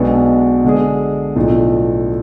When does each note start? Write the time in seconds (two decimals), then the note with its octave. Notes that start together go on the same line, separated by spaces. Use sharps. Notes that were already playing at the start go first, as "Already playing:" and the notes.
Already playing: B1 B2 G#3 B3 D4
0.64 D3 G#3 D4 G#4
1.36 B1 A2 F3 A3 D4